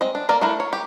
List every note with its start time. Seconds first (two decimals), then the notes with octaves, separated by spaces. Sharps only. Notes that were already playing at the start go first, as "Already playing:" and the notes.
0.01 G#3 C4 D#5
0.15 D4
0.29 A#3 A#4 D5 A#5
0.41 A3 D4 E4 A#4
0.60 C#5
0.73 G4